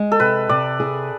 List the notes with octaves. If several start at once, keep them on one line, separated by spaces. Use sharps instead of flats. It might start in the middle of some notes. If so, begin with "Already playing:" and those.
Already playing: G#3
A4
C3 B4
C3 D5
G#4